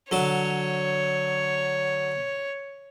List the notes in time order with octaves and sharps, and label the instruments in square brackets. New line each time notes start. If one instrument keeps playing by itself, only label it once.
[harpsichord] D3 F#3 A5 [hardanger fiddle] C#5